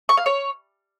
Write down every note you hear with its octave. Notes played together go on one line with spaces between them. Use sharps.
C#6
F5
C#5